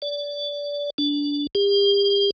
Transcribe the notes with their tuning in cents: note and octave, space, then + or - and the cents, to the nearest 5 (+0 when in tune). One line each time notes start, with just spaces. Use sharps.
D5 -25
D4 -20
G4 +40